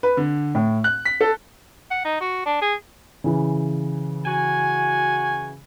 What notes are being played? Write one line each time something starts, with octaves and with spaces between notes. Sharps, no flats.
B4
D3
A2
F#6
B6
A4
F#5
D#4
F#4
D4
G#4
C#3 E3
F#4 G#5